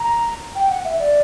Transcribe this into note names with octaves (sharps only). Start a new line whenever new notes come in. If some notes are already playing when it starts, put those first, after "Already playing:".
Already playing: A#5
G5
F#5
E5
D5